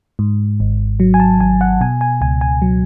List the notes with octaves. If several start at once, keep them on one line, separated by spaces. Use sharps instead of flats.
G#2
G#1
F#3
G#5
A5
G#1 G#5
F#5
B2 G#5
G#5
C#2 G#5
G#5
F#3